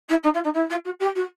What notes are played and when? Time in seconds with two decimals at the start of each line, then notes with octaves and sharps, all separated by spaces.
0.09 E4
0.23 D#4
0.34 F4
0.44 D#4
0.54 E4
0.69 F4
0.85 F#4
1.00 G4
1.15 F#4